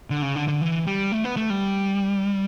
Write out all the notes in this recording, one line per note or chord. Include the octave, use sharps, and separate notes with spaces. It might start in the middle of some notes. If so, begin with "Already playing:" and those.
D3
C#3
D3
D3
E3
G3
A3
B3
A3
G3